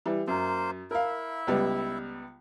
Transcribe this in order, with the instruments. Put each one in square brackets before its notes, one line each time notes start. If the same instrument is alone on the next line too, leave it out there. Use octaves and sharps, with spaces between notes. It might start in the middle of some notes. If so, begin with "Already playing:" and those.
[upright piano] E3 G3
[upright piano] F#2 [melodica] A#3 C5
[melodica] E4 E5 [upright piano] A#4 F5
[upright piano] C#2 G3 B3